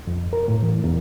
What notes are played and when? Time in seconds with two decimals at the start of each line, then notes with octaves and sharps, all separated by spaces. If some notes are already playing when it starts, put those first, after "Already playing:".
0.07 F2
0.33 A#4
0.48 A2
0.63 E3
0.84 E2